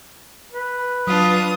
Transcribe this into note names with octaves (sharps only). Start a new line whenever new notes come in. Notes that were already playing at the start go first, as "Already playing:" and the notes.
B4
F#3 D4 F4 D#6